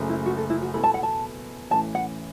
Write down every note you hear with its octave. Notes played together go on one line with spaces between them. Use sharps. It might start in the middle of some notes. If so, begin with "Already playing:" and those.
Already playing: F#1 F#2 C#3 A3
E4
F#4
A4
E4
F#4
E2 B2 B3 E4 A4 B5
A5
F#5
A5
A1 A2 E3 C#4 E4 A5
F#5